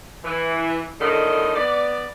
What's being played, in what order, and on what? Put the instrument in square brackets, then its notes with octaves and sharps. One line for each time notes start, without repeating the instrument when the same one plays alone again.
[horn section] E3
A2 D3 D#3 G3 D#5
B3 D5